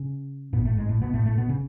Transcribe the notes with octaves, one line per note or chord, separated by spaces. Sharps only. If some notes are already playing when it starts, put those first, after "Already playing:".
Already playing: C#3 C#4
G#1 G#2 B2 B3
A2 A3
G#2 G#3
A2 A3
B2 B3
A2 A3
A2 A3
B2 B3
C#3 C#4